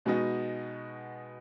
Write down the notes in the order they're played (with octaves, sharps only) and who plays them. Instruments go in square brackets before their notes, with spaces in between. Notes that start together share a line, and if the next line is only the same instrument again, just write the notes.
[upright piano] B2 G#3 B3 D#4 F#4